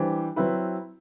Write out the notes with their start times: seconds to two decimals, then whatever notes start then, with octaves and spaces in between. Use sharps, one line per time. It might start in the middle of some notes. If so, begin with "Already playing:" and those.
Already playing: E3 G3 D4 G4 C5
0.36 F#3 C4 E4 B4